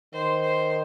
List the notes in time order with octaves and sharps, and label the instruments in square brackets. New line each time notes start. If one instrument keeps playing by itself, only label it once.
[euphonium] D#3 [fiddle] C5
[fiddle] C5